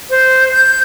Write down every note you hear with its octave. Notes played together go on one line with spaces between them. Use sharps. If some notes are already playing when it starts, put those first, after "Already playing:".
C5
G6